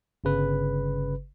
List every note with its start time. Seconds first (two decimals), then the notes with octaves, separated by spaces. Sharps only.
0.24 G1 C#3 B4